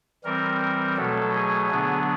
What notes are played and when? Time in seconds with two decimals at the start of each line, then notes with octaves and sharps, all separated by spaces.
0.24 E3 G3 C4 A#4
0.61 A#4
0.97 B2 F#3 A3 A4
1.34 G#4
1.70 D3 F#3 B3 D4